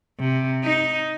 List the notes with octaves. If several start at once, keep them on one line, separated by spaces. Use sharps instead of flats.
C3
D#4